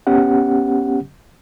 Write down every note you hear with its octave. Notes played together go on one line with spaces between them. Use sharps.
B3 C#4 G4 F#5